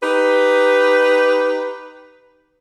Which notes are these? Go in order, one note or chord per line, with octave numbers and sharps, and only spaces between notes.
D#4 G4 B4